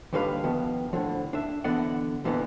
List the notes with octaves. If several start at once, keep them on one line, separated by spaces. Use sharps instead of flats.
D#2 G#2 D3 G3 B4 F5
D#3 F3 B3
A2 D3 F3
D4 E5
D3 E3 B3 D5 D#5 F#5
F2 A#2 D3 E3 B3